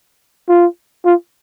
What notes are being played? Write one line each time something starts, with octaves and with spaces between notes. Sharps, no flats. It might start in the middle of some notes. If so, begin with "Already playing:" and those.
F4
F4